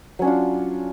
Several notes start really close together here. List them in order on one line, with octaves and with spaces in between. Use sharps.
F#3 C#4 D4 F4